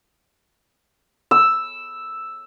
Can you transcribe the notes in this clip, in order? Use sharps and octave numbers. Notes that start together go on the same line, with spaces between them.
E6